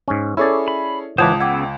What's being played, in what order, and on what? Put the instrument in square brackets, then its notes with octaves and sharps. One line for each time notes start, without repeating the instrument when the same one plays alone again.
[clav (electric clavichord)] G#2 C#4
[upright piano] C#4 G#4 A4 [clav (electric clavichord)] E4 C#5 D5
[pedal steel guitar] B5
[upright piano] C#2 [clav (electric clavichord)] E3 F#5 [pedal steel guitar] C5 C#5 D6 [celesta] A5 D#6
[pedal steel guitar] C#3 B3 E6 [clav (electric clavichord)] F#5 [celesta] G5 D6 G#6